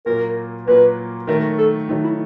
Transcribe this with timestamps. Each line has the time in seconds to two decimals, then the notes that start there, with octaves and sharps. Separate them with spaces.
0.06 A#2 F#3 A#3 A#4
0.67 A#2 F#3 A#3 B4
1.27 D#3 F#3 A3 A#4
1.58 A4
1.89 D#3 F#3 A3 D#4
2.04 E4